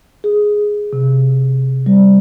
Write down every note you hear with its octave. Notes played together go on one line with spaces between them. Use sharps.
G#4
C3
G3